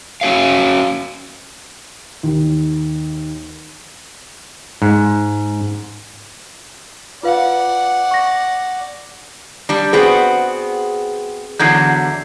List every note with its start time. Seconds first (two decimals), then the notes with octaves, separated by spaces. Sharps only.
0.21 C#4 F#4 C#5 F5
2.23 D#2
4.82 G#2
7.23 F4 B4 D5 F5 F#5
8.11 C#6 A#6
9.69 G3 D4
9.93 B3 C4 F#4 G#4
11.59 E2 D3 F#3 G6 G#6 C7